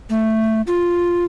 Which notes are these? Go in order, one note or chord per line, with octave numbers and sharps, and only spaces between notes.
A3
F4